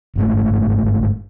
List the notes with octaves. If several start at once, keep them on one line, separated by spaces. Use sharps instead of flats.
G1 G#2 A3